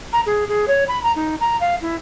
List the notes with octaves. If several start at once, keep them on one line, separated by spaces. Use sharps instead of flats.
A#5
G#4
G#4
C#5
B5
A#5
D#4
A#5
F5
E4